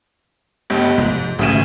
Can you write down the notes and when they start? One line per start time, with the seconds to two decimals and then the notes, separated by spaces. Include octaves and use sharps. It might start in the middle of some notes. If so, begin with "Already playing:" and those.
0.70 G1 C#2 G2
0.98 F1 G#2
1.39 D#1 G#1 D2 C#3 D#7